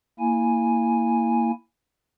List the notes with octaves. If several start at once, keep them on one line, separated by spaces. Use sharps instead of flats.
A#3 E4 G#5